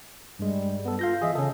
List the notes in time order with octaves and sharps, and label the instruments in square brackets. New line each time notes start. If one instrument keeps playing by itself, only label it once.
[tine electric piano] G2 G#3 [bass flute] G3
[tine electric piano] B3 A4
[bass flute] F4 [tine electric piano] F5 G6 A#6
[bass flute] E3 [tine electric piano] G#4 D#5 E5
[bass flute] C#3 [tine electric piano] C#4 A4